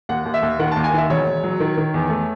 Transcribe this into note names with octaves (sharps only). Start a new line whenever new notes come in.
D#2 F#5
D#2
E5
D#2
D#3 F#5
D#2 A5
G#5
D#3 E5
E1 C#5
E1
F#3
D#3
D#3
E2
A3